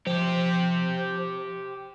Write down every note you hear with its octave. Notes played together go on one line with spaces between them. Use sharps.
F3 G4 C5